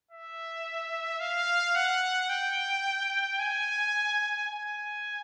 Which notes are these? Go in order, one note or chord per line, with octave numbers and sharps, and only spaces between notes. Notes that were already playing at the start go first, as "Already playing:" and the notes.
E5
F5
F#5
G5
G#5
G#5